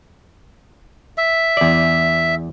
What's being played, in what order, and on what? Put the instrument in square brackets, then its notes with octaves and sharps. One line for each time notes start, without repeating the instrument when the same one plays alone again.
[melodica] E5
[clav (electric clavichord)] E2 D5